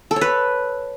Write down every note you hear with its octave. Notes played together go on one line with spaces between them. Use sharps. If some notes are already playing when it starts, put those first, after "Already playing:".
A4
C#5
B4